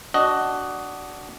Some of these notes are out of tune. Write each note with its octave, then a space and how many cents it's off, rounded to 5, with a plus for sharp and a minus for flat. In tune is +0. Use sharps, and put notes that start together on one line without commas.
D4 -10 F#4 +15 D#5 +0